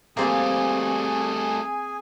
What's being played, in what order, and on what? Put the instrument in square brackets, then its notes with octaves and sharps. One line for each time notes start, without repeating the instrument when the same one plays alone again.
[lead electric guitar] G3 A3 [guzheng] A#3 C4 [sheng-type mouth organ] G#4 G#5